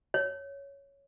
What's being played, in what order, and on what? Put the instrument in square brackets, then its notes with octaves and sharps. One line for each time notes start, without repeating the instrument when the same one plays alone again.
[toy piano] C#5